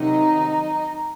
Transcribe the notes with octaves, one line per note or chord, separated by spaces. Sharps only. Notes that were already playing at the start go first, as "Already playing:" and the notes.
Already playing: C3 D#3 F#3 D#4